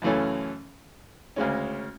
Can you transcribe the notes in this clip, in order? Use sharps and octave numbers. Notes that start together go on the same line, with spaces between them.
F#2 C#3 E3 A3 C#4
D2 C#3 G#3 C#4